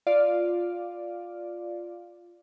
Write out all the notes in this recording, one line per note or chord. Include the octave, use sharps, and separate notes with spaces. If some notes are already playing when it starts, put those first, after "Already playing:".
F4 D5 F5